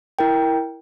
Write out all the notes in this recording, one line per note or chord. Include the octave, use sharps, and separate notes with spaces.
E4 A#4 G5